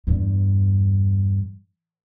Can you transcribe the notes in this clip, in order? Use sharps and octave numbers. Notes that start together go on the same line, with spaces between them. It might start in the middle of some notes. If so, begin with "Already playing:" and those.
E2 G2